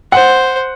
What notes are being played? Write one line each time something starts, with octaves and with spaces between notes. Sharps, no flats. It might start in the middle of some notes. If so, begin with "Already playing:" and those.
C5 F#5